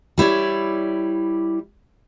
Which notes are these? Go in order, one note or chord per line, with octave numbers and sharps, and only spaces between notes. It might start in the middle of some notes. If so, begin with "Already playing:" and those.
G3 E4 C#5 D5